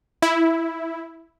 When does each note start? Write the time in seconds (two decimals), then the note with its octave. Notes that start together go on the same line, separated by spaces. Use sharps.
0.22 E4